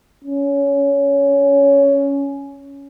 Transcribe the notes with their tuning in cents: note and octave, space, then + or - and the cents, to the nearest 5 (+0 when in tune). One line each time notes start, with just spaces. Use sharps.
C#4 +15